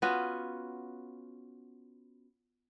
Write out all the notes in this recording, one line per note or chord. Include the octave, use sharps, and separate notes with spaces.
B3 C#4 F4 F#4